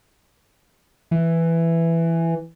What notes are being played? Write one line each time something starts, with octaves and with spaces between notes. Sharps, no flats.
E3